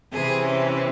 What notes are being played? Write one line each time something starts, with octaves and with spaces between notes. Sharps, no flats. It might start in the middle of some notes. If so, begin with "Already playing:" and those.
C3 E3 C4 G#4
C#4